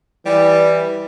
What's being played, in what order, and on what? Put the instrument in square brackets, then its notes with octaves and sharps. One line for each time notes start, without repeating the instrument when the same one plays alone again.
[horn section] E3 G3